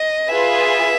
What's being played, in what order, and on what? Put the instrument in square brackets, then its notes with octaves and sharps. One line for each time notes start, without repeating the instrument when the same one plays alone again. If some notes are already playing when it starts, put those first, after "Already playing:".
Already playing: [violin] D#5
[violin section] F4 G#4 B4 [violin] E5